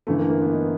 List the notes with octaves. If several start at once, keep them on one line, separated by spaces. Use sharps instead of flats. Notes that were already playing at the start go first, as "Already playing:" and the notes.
G1 G2 E3 A3
A#3
A#3
B3
D#4